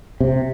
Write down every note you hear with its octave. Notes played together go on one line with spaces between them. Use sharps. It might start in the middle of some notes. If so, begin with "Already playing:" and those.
C3